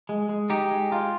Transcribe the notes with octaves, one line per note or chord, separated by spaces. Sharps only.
G#3
G#3
D#4 G4
G#3
F4